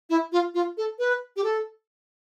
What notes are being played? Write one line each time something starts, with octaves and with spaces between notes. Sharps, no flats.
E4
F4
F4
A4
B4
G4
A4